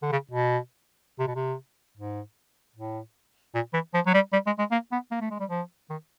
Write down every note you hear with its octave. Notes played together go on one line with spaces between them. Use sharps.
D3
C#3
B2
C3
B2
C3
G#2
A2
A#2
E3
F3
F#3
G3
G3
G#3
G#3
A#3
B3
A#3
A3
G#3
G3
F3
D#3